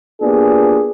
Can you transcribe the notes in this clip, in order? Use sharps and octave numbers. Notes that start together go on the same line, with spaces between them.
A#3 B3 D4 F4 G4 G#4